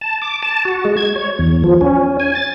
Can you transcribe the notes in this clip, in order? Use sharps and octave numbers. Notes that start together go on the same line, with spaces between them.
A5
D6
A5
F#4
G#3
G#6
C#5
E2
F3
C#4
G#5
A6